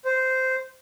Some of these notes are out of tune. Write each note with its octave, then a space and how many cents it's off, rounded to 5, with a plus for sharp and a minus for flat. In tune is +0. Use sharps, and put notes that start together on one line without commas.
C5 -10